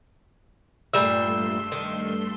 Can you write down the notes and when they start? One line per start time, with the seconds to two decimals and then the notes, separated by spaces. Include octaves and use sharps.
0.94 G2 A#2 G3 A3 E5 C6 E6 E7
1.72 D#3